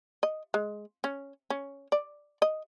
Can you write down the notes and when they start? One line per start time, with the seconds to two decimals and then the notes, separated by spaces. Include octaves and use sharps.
0.23 D#5
0.54 G#3
1.04 C#4
1.50 C#4
1.92 D5
2.42 D#5